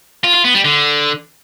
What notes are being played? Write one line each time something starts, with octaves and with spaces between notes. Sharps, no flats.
F4
F4
B3
G3
D3